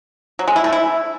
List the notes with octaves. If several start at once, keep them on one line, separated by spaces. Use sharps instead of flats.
F#3
G#3
E4
A3
E4